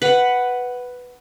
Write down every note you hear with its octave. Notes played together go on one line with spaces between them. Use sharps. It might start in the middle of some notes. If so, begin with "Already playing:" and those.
B4 F#5